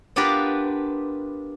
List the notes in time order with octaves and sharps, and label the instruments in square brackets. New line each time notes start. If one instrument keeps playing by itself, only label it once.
[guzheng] B3 D4 F4 G4 A#4 B4